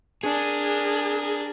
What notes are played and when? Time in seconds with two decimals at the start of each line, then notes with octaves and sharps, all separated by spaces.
0.23 D4 G#4 A#4